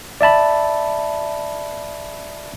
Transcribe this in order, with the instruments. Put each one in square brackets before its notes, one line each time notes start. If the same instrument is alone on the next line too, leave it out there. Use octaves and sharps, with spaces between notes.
[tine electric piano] D5 E5 A5 B5